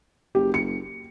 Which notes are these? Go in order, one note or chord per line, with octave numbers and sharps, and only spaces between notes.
F#1 G4
C#7